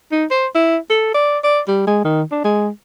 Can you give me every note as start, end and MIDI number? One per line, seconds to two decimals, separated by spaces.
0.12 0.25 63
0.31 0.47 72
0.55 0.77 64
0.90 1.12 69
1.15 1.39 74
1.44 1.61 74
1.68 1.86 55
1.87 2.00 56
2.05 2.22 51
2.32 2.45 62
2.45 2.69 56